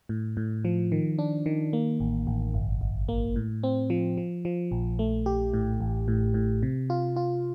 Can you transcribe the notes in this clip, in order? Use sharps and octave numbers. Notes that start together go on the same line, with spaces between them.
A2
A2
F3
D#3
D4
D#3
A#3
A1
A1
G1
G1
A#3
A2
C4
F3
F3
F3
A#1
A3
G4
A2
A1
A2
A2
C3
F4
F4